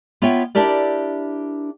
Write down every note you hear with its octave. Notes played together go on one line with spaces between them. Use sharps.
B3 F4 C#5 E5 G5
D4 E4 G4 A#4 D5